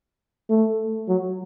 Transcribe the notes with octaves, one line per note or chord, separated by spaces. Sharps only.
A3
F#3